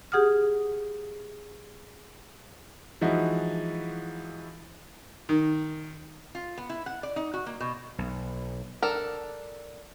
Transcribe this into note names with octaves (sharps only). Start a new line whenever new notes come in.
G4 G#4 F#5 D#6 F6
E3 F3 G#3 D#4 E4 F#4
D#3
F4
B3
E4
F#5
D5
D#4
F#4
A#3
B2
B1
D4 A4 A#4